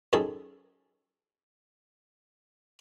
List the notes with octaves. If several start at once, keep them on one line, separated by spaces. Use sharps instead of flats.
F#2 D#3 G#4 A4